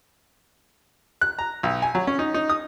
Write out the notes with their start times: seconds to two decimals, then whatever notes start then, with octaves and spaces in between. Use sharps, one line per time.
1.21 F#6
1.39 A#5
1.63 B1
1.82 G#5
1.95 F#3
2.07 C#4
2.19 D#4
2.34 D#4
2.50 D#6